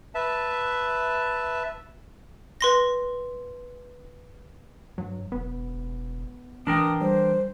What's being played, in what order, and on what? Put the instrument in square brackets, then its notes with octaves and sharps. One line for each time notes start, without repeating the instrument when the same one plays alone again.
[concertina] B4 E5 A5
[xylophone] B4 C6 A#6
[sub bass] G2 [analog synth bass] F#3
[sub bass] E1 [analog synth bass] B3
[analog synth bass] A1 [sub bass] E3 [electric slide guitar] D4 A#4 G5 [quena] D#6
[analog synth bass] G3 [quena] C5